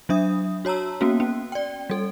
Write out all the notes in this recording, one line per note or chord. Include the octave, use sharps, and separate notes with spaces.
F#3 D4 E5 D#6
F#4 C#5 A5 A#5 E6
A#3 B3 C#4 F#4
C#4
D5 G5
G3 A4